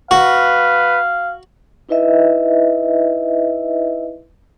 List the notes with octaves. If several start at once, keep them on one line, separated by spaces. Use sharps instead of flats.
F#4 B4 F5
D#4 E4 B4 D#5 E5